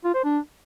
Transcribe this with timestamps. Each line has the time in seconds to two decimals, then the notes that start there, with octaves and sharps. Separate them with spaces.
0.05 F4
0.15 C5
0.24 D4